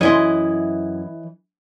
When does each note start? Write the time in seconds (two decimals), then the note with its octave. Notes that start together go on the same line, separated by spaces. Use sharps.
0.01 F#2 E3 E4 C#5 D#5 C6